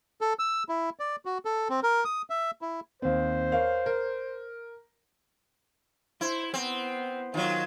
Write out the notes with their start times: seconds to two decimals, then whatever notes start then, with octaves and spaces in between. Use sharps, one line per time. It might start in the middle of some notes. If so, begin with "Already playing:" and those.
0.21 A4
0.39 E6
0.69 E4
0.99 D5
1.25 F#4
1.45 A4
1.70 C4
1.83 A#4
2.05 D#6
2.30 E5
2.62 E4
3.02 D#2 C4 C5
3.52 A#4 C#5 F5
3.86 A#4
6.21 E4 C5
6.54 B3 C4
7.34 D#3 F#3 F4